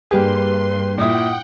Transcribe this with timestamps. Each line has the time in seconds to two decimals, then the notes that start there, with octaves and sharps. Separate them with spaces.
0.11 G2 G3 A#3 G4 G#4 B4 C6
0.98 A#2 E4 F#5 G5 D#6